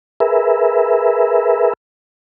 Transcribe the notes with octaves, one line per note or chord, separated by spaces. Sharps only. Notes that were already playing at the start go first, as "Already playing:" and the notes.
G#4 A#4 B4 E5